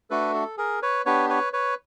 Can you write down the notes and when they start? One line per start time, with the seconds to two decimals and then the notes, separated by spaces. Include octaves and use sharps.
0.10 A3 D4 F#4 A4 B4
0.34 A4
0.58 G#4 A#4
0.82 B4 C#5
1.06 B3 D4 G4 B4 C#5
1.29 B4 C#5
1.53 B4 C#5